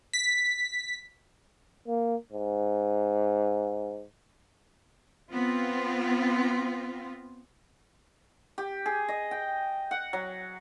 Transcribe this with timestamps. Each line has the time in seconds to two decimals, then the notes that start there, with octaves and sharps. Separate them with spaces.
0.13 B6
1.88 A#3
2.33 G#2
5.32 B3 C4 F4
8.58 G4
8.86 G#4
9.08 D#5
9.31 G5
9.91 F#5
10.13 F#3